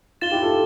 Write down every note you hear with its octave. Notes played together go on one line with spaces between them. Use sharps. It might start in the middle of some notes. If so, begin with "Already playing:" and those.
F4 A6 E7 G7
E4 G4
F4 A4